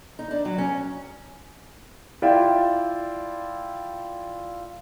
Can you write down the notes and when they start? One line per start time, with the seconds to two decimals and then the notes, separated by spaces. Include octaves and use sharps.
0.19 D#4
0.31 D4
0.45 F#3
0.58 C#4
2.22 E4 F4 D5 E5 G5